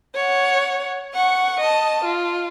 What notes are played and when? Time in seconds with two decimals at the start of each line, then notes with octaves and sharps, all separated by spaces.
0.15 C#5 F#5
1.14 F#5 C#6
1.60 D#5 A5
2.04 F4